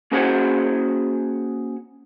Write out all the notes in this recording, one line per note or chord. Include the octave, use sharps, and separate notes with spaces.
A#3 C#4 F#4 G#4 C5 F#5